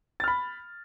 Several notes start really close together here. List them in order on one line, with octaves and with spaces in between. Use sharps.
A6 F6 B5